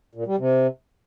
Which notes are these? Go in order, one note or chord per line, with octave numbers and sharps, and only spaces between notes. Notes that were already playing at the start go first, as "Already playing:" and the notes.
A#2
G3
C3